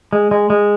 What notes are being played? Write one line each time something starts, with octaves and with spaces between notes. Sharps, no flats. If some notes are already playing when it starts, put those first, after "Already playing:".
G#3
G#3
G#3